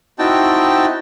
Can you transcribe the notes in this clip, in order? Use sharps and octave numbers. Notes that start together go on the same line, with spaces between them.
C4 D#4 E4 F#4 G5 A5